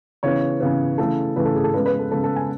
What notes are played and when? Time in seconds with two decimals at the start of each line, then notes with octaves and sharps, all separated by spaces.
0.23 C#3 E3 B3 C#5
0.60 C#3 E3 B3
0.98 C#3 E3 A3 A4
1.36 C#3 E3 A3 B4
1.45 A4
1.55 G#4
1.64 A4
1.74 C#3 G#3 B3 B4
1.86 B4
1.99 A4
2.11 C#3 G#3 B3 A4
2.24 A4
2.36 G#5